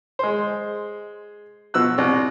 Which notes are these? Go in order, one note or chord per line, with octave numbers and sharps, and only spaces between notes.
G#3 C5
B2 F3 E6 F#6
C2